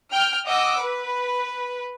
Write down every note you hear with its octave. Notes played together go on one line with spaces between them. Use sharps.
G5 F6
D#5 F#5 D6 E6
B4